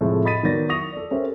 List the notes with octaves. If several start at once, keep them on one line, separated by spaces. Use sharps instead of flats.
A2 C3 F3 G#3 A3
D#5 B5 D#6 A6 B6 D#7
D#3 F#3 B3 D5 A6 A#6
E4 C#6 D#6 A#6 F7
A4 D5
C#4 G4 A4 A#4 C5 E5